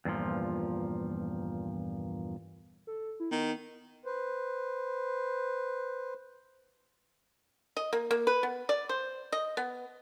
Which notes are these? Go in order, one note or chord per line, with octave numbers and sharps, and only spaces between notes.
E2 G2 A#2 F3
A4
E4
D#3 B3
B4 C5
D#5
A#3
A#3
B4
B3
D5
C5
D#5
B3